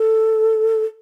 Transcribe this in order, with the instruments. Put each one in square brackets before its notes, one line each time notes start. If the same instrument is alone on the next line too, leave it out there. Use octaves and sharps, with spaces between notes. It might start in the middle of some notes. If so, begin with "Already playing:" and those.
Already playing: [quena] A4